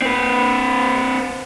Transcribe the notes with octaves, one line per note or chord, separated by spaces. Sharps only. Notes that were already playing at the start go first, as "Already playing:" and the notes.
C4 B4